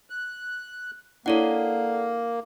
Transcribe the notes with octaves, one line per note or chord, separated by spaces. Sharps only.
F#6
A#3 D4 E4 A4 C#5 D5 F#5